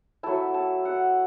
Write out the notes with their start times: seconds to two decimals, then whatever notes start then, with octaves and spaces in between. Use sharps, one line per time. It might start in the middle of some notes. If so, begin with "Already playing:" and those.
0.23 F#3 A3 E4 A5
0.54 A5
0.85 F#5